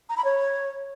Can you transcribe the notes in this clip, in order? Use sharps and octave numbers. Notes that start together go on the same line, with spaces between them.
A#5
B5
C#5